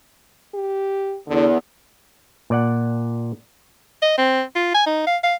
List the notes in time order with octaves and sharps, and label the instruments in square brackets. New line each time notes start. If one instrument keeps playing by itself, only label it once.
[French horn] G4
[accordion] E2 [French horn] D3
[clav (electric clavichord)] A#2 D5 F#5
[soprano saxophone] D#5
C4
F4
G#5
D#4
F5
F5